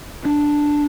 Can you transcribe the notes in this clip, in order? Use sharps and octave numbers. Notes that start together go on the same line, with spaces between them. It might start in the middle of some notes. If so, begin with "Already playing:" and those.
D4